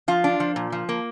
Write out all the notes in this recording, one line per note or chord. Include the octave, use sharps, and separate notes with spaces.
F3 F4
D4
F3
A#2
F3
A#3